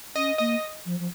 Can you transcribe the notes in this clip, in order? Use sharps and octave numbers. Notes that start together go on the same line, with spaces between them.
C#4 D#5
A#3 D#5
F3
F3